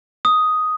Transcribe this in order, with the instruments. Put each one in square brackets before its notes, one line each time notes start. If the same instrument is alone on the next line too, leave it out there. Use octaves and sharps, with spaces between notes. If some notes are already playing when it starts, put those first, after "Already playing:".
[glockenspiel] D#6